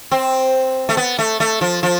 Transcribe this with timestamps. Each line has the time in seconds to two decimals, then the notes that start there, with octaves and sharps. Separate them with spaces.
0.11 C4
0.89 A3
0.97 B3
1.19 A3
1.40 A3
1.61 F3
1.83 F3